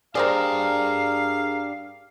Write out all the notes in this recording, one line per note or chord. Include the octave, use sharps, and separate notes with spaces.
A#3 D4 G4 G#4 A#4 C5 D5 F5